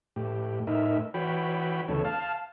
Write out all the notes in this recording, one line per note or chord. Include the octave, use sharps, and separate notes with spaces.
A2 G4
A2 D#4 A#4 E5
E3 F#4 C#5 G5 B5
D2 C#3 E3 A4 C#5
F5 A5